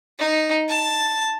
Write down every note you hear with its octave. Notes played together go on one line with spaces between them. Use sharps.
D#4
A5